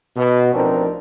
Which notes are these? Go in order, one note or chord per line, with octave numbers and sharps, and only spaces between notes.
B2
A1 F3 C4 D4 D#4 A#4